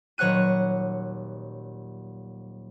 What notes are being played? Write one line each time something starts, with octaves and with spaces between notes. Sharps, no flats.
D#1 F#3 C#5 F#5 F#6 D#7